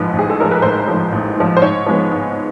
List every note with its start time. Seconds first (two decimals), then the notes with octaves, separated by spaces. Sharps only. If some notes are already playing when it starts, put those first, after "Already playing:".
Already playing: A1 G#2 F3 B4
0.13 A1
0.19 G#4
0.30 A4
0.38 G#2 F3 A#4
0.51 B4
0.62 A1 C5
0.88 G#2 F3
1.12 A1
1.37 G#2 F3
1.57 C5
1.62 G#2 C#5
1.87 F3 G#3 B3
2.11 G#2